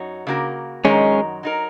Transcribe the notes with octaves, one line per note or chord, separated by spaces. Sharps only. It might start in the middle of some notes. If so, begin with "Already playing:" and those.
Already playing: F#2 F#3 D#4 F#4
C#3 A#3 F#4 A#4
F#2 D#3 F#3 G#3 C#4 D#4 A#4
F#3 D#4 A#4